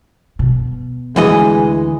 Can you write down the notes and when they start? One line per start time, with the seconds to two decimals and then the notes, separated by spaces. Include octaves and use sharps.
0.39 B2
1.16 D2 E3 G#3 D#5